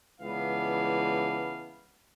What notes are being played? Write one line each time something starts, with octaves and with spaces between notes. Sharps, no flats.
C#2 E3 B3 D4 F5